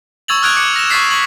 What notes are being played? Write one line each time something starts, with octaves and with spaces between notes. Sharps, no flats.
C#6 E6 G#6 A6 F7 F#7
D#6 F6 F#6 G#6 D7 F7
D6 F#6 C#7
A#6 E7
C#6 D6 F#6 A6 B6 C7
C#6 F#7